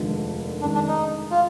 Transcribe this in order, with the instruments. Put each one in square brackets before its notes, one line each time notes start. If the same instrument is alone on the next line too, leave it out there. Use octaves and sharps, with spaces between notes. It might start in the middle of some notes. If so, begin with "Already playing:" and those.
Already playing: [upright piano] F1 D#2 D3 F3 G#3
[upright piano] F#2 D#3 G#3 [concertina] D4
[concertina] D4
D#4
F4